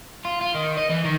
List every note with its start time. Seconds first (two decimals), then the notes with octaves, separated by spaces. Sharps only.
0.25 F4
0.41 F4
0.55 D#3
0.77 D#5
0.90 E3
1.05 D#3